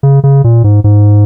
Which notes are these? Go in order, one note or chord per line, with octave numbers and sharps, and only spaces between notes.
C#3
C#3
A#2
G#2
G#2